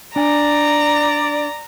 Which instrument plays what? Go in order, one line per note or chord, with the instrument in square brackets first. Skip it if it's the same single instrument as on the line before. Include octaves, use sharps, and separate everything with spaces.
[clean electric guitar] D4 G#5 [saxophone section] D5 [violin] A#5